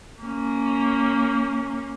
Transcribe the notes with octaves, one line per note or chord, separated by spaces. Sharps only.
A#3 C#4